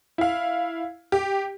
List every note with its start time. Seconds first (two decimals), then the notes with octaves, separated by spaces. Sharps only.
0.18 E4 F5
1.12 G4